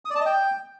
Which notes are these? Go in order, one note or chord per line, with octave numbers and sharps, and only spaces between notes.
D#6
D5
A5
D#5
G5